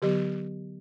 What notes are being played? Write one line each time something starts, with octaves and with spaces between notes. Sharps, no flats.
D3 F#3 B3 G4